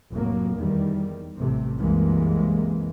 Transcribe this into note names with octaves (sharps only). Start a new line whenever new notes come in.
F1 A2 F#3 A#3
E2 D#3 G3
A1 C3 A3
C2 F#2 C3 E3 G#3 A#3